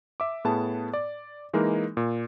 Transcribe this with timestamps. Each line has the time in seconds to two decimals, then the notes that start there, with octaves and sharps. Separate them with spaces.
0.20 E5 D6
0.45 A2 B3 G#4 A5
0.94 D5
1.54 E3 G#3 A#3 D#4 A#4
1.97 A#2